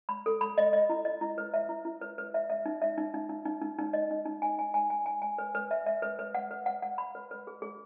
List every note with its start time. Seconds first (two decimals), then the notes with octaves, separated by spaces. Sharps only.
0.09 B5
0.26 A4
0.41 B5
0.58 D#5
0.73 D#5
0.89 E4
1.05 D#5
1.21 E4
1.38 B4
1.54 E5
1.69 E4
1.85 E4
2.01 B4
2.18 B4
2.34 E5
2.50 E5
2.66 D#4
2.82 E5
2.98 D#4
3.14 D#4
3.29 D#4
3.45 D#4
3.62 D#4
3.79 D#4
3.93 D#5
4.11 D#4
4.26 D#4
4.42 G#5
4.59 G#5
4.74 G#5
4.90 G#5
5.06 G#5
5.22 G#5
5.38 B4
5.55 B4
5.71 E5
5.86 E5
6.02 B4
6.19 B4
6.35 F#5
6.51 B4
6.66 F#5
6.82 F#5
6.98 B5
7.15 B4
7.31 B4
7.47 G#4
7.62 G#4